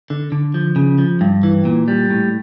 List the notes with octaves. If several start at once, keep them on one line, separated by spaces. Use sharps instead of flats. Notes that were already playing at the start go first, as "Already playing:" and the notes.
D3
D3
F3
C#3
F3
G2
E3
A#2
G3
A2